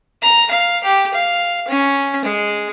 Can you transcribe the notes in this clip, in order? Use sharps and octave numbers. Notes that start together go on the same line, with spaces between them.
A#5
F5
G4
F5
C#4
G#3